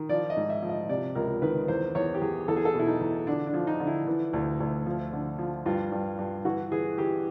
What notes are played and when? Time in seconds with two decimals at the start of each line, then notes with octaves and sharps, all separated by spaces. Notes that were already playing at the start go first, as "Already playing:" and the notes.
Already playing: D#3
0.09 F3 D5
0.30 D#5
0.36 G#2
0.50 E5
0.62 F3
0.69 D#5
0.89 C3 D5
1.15 C#2 A#4
1.42 D#3 B4
1.68 E2 C5
1.95 E2 C#5
2.14 G4
2.21 E2 G#4
2.48 E2 A4
2.57 G#4
2.65 A4
2.74 B2 E4
2.87 D#4
3.01 E2
3.27 D3 D4
3.47 D4
3.54 F3
3.67 D#4
3.80 D3
3.87 E4
4.07 E3
4.33 D2
4.60 D2
4.86 F3
5.13 D3
5.39 F3
5.66 G2 F4
5.92 G2
6.19 G2
6.45 E3 F#4
6.72 E3 G#4
6.98 E3 G4